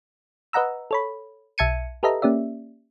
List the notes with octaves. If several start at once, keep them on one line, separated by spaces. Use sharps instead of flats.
B4 D#5 F#5 A#5 E6
A4 C#5 B5
B1 E5 A5 G#6 C#7 D#7
G4 A4 B4 D#5 E5 A#5
A#3 C#4 G4 D5 E5